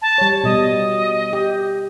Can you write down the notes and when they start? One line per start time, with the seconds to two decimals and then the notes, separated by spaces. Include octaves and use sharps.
0.02 A5
0.18 G3 C#5
0.44 B2 G3 D#5
1.33 G4